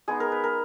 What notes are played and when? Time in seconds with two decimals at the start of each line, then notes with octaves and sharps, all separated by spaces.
0.08 G#3 B3 D#4 G#4
0.20 A#4
0.32 B4
0.44 A#4